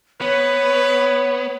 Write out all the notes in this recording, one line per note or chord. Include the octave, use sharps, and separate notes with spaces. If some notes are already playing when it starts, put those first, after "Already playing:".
B3 B4 C#5